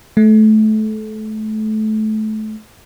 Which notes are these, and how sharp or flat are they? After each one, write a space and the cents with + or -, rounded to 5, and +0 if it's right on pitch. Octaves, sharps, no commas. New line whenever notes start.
A3 -25